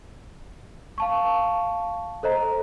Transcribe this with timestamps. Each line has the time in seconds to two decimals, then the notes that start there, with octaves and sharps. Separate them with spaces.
0.98 F5 A5 C#6
2.23 A4 C5 D#5 A#5